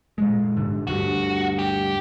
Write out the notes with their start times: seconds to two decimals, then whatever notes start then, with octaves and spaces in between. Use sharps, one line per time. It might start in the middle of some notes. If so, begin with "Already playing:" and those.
0.18 A#2 G#3
0.56 G#2 D3
0.87 D2 G2 F#4
1.59 G4